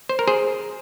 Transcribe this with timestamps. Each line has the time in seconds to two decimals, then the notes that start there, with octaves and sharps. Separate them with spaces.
0.09 C5
0.19 A#4
0.28 G#4 C5